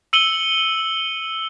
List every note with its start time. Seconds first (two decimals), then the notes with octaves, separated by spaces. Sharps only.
0.13 E6 C#7 D#7 F#7 G7